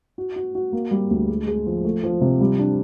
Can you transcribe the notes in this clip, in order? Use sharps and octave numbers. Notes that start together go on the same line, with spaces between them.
F#4
F#4
F#4
A#3
G3
D2
G#3
G#3
F3
A3
F3
C3
G3
D4